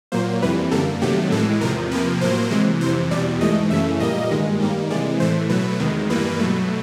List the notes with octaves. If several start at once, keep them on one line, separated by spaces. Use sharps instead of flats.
A#2 F#3 A#3 C5
F2 C3 E3 G3 B4
F#2 D3 G3 A#3 A4
C3 D#3 F#3 A3 G4
A2 E3 G#3 A4
E2 C3 F3 A#4
C3 F3 A#3 B4
A2 F#3 A#3 C5
C3 E3 G#3
F2 C3 E3 C5
E2 B2 G3 D5
G#2 E3 A3 D#5
F#2 C#3 E3 A3 E5
A#2 G3 A#3 D#5
G2 D#3 G#3
G#2 D#3 G3 A#3
C3 E3 G#3 D5
A2 E3 A3 C5
B2 F#3 A3 B4
E2 C3 D#3 G#3
G2 E3 G3 A#3 B4
B2 F#3 A3